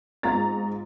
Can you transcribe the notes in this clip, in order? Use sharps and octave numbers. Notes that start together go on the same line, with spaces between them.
G#2 F4 A#5 A6